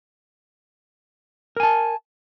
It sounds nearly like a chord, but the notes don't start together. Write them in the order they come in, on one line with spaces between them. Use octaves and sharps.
A#4 G#5 A5